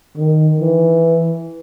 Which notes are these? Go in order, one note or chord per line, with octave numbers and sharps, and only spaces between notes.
D#3
E3